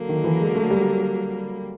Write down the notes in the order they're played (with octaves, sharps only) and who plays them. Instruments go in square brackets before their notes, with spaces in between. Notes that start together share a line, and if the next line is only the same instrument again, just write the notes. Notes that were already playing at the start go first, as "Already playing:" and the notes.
Already playing: [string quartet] D3 F#3 A#3
[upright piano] D#3
E3
G#3
A3
G3